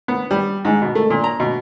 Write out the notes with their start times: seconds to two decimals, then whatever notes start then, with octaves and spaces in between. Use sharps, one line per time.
0.08 B3
0.31 G3
0.65 G#2
0.82 B2
0.95 A3
1.10 A#2
1.24 A#5
1.40 B2